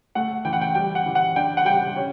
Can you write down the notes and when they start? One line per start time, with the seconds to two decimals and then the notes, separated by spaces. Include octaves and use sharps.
0.15 A3 F#5
0.45 E3 G5
0.53 F#5
0.61 G5
0.75 G3 G5
0.95 F#5
1.06 E3
1.15 F#5
1.36 D4 G5
1.57 F#5
1.65 G3 G5
1.96 C#4